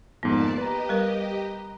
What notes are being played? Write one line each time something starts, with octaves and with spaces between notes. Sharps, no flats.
F2 G#2 D#3 A#3 B3 D5 A5
G4 B4 D#5 A#5
G3 A#4